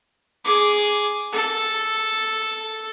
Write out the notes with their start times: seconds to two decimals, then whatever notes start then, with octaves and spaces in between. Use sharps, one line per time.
0.44 G#4 D6
1.32 A4